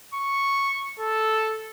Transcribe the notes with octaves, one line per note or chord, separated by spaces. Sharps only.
C#6
A4